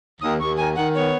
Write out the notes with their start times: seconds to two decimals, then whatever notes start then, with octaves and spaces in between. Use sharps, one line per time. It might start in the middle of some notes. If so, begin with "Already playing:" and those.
0.21 D#2 D#6
0.40 D#2 C#6
0.57 D#3 G#5
0.76 D#3 F#5
0.94 B3 C#5